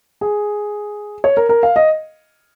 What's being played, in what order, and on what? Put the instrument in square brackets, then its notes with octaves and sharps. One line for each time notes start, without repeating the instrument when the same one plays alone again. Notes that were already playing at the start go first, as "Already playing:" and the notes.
[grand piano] G#4
C#5
A#4
A#4
F5
D#5